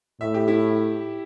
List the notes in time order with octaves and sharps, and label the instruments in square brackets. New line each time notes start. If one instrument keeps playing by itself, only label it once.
[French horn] A2 [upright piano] E5
[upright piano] G4
E4